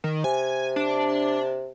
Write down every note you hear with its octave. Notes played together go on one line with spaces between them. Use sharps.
D#3
C3 G#5
D4